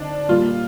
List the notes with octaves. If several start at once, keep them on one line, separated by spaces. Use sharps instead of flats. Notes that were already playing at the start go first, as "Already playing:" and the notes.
Already playing: D3 C4 D4 D#4
A#2 G3 A#3 F4